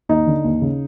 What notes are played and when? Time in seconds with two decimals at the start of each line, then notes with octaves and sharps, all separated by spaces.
0.09 D#2 D#4
0.26 D3
0.44 D#2
0.61 C#3